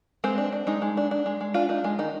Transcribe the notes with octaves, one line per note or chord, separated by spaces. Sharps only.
G#3 C4 C5
D4
D4
G#3 D#4
G#3
D4
D4
G#3
G#3
D4 F4
D4 D#4
G#3 F4
D#3 D#4